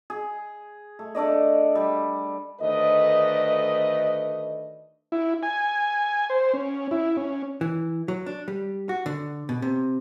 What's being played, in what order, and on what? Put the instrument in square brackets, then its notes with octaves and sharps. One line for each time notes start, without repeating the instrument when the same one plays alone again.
[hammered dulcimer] G#4
A3
A3 D4 D5 D#5
G3
[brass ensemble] D2 D#3 A3 B4 D5 D#5
[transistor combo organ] E4
G#5
C5
C#4
E4
C#4
[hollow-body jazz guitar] E3
F#3
D4
G3
F#4
D3
B2
C3